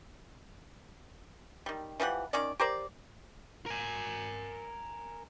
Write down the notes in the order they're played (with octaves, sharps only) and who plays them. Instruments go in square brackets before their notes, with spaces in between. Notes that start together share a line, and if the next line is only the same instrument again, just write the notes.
[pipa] D#3 G3
E3 F3 G3 F#5
D#3 C#4 D5
G4 A#4 C5 D5
[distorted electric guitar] A#4 G#5